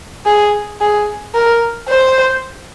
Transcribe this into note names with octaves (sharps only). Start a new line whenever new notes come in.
G#4
G#4
A#4
C5